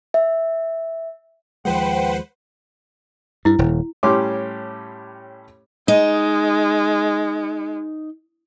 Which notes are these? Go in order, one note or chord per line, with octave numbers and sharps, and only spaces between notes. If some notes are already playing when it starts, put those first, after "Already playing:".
E5
D#2 F3 G#3 B4 C5 F#5 G5
G2 E4
D#1
A2 G3 C#4 G4 C6 D6
G#3 D#4